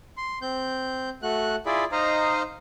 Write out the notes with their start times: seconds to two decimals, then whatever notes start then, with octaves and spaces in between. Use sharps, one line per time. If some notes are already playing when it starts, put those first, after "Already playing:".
0.17 C6
0.42 C4 G6
1.23 A3 F#4 F#6
1.66 E4 F4 G#4 D5 B5
1.92 D#4 C5 D#5 F5 A#5